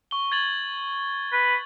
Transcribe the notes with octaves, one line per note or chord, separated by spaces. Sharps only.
C#6 G7
G#6 A6 F#7
B4